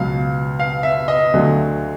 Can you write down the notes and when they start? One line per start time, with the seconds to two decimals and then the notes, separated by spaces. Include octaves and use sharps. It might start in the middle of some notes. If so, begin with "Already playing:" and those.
Already playing: C#2 B2 F#3 F5
0.60 F5
0.83 E5
1.08 D#5
1.34 D2 D3 F#3